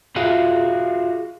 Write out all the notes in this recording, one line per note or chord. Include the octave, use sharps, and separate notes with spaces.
F4 F#4 G#4 E5 F5